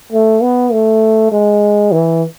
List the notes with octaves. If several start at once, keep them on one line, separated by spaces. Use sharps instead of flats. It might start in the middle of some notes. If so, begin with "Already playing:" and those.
A3
B3
A3
G#3
E3